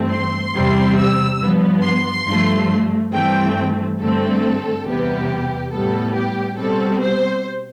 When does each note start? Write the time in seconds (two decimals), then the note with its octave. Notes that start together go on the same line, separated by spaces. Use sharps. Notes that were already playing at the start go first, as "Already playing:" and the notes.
Already playing: G2 E3 A3 C4
0.11 C6
0.53 E2 C3 G3 C4
0.97 E6
1.41 G2 F3 B3
1.83 C6
2.27 G2 F3 A3
3.12 G2 E3 A3 C4 G5
3.99 G2 D3 A3 C4 A4
4.85 E2 C3 G3 B3 G4
5.71 A2 G3 B3 A4
6.15 G4
6.57 B2 G3 C4 A4
7.01 C5